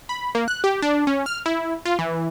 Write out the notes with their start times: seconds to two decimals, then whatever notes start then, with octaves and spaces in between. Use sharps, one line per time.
0.09 B5
0.35 A#3
0.48 F#6
0.64 G4
0.82 D4
1.07 C#4
1.26 F6
1.46 E4
1.85 F4
1.99 E3